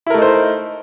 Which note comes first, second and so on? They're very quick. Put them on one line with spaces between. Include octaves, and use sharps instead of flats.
E4 A#4 A3 D#4 C5